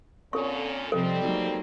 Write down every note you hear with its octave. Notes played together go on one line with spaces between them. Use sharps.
A#2 D3 C4 C#4 A4 C#5 C#6
C3 F3 G3 C4 A4 C5 D#5
F#3 A#3 D#4 F#4